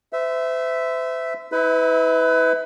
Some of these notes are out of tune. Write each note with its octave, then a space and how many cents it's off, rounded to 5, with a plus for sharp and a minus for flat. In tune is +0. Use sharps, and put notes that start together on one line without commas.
C5 -40 E5 +0
E4 -35 B4 +25 E5 -15